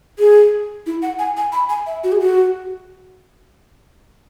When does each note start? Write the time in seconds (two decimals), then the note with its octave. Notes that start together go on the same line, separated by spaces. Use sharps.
0.19 G#4
0.86 E4
1.02 F#5
1.19 G#5
1.37 G#5
1.52 B5
1.69 G#5
1.86 E5
2.04 F#4
2.12 G#4
2.20 F#4